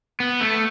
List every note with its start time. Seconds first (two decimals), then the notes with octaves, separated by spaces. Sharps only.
0.20 B3
0.41 A3